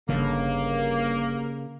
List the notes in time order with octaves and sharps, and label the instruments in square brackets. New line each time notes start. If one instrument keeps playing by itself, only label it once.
[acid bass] G1 [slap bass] C#3 [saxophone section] A#3